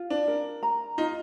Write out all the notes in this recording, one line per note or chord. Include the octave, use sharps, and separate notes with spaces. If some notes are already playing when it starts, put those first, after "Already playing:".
Already playing: F4
D4
A#4
A#5
D#4 F4